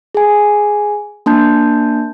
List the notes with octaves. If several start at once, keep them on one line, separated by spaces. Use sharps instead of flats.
G#4 G#5
A#3 D4 A5 G6